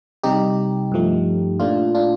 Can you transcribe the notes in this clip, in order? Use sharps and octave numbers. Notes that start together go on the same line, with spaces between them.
C3 G3 D#4 G4
G2 F3 A3
A#2 A3 D4 F4
D4 F4